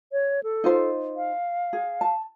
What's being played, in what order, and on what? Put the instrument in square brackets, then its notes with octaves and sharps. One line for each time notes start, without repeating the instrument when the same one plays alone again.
[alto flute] C#5
A4
[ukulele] D#4 F4 C5
[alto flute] F5
[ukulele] G#4
A5